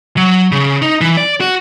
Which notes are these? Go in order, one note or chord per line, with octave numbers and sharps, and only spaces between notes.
F#3
C#3
D#4
E3
D5
F#4